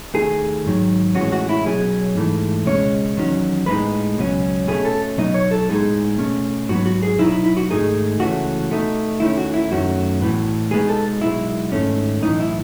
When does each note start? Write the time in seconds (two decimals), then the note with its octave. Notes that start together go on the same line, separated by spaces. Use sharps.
0.14 D#2 D#3 A3 G#4
0.65 G#2 D#3 F#3
1.15 A2 E3 G#3 C#4 F#4
1.32 F#4
1.49 E4
1.66 B1 B2 F#3 C#4 G#4
2.15 G#2 E3 A3
2.66 C#2 B2 G#3 C#4 C#5
3.17 E2 D#3 F#3 C#4
3.66 A2 G#3 B3 D#4 B4
4.17 C#2 B2 F#3 C#4
4.67 B2 A3 C#4 G#4
4.85 A4
5.17 B1 B2 F#3 B3 D#4 D#5
5.34 C#5
5.51 A4
5.69 A2 G#3 B3 D#4 G#4
6.18 B2 A3 C#4
6.69 G#2 F#3 B3 F#4
6.86 F#4
7.03 G#4
7.19 B2 F#3 B3 D#4 E4
7.32 E4
7.44 E4
7.57 F#4
7.70 G#2 D#3 A3 D#4 G#4
8.19 C#2 C#3 E3 A3 C#4 F#4
8.70 B2 A3 D#4
9.20 D#2 D#3 A3 C#4 E4
9.38 F#4
9.54 E4
9.71 F#2 D#3 A3 C#4 F#4
10.21 A2 E3 B3
10.71 B2 G#3 B3 D#4 G#4
10.89 A4
11.21 B1 B2 G#3 E4
11.72 G#2 D#3 A3 C#4
12.22 B1 A2 E3 D#4
12.40 E4